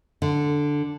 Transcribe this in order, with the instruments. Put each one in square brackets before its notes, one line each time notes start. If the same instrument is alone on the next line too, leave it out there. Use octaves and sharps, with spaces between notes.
[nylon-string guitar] D3